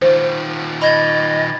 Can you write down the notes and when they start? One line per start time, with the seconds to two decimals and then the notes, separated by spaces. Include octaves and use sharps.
0.02 D#3 F4 C5
0.82 D#5 B5 G#6 A6